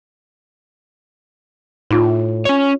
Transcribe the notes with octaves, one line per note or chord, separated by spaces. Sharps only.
A2 D#4 F4
C#4 C#5